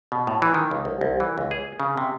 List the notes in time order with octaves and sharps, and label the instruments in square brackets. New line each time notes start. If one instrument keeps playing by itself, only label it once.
[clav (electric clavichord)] B2
A2
E3
D#3
C#2
C2
C2
E3
C#2
G#4
C#3
C3